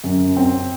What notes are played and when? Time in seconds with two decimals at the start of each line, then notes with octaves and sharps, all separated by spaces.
0.04 F#2
0.37 C4